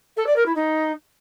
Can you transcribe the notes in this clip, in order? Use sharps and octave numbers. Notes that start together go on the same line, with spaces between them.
A4
D5
A#4
E4
D#4